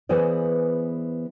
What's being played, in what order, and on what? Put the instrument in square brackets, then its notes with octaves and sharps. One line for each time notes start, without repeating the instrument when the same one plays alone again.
[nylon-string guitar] E3 B3 G#4 C5 D5